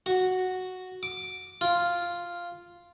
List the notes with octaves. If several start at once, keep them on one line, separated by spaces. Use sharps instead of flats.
F#4
D6
F4